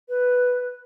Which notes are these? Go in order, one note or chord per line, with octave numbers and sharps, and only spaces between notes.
B4